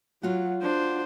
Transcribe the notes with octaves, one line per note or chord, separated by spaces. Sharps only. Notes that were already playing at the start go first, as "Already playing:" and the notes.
F#3 F4 F#4 F#5
D4 C5